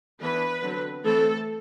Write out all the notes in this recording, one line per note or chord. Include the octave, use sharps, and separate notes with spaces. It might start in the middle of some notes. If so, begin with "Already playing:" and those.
E3 B3 D4 B4
D3 F#3 C4
E3 A3 C4 A4